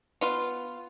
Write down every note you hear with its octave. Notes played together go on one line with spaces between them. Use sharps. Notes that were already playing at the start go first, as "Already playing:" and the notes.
B3 F4